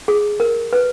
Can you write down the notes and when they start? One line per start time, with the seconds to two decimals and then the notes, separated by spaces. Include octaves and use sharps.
0.08 G#4
0.40 A#4
0.73 B4